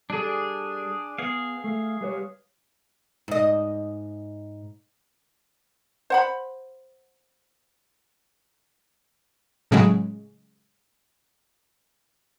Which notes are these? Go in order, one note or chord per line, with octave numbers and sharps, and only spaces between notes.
G3 D4 G#4 A4
B3 G#4 F5
A3
G3 B4 C#5
G#2 D#5
C5 F#5 B5
A2 C#3 F#3 G#3